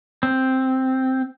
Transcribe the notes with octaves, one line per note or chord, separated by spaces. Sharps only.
C4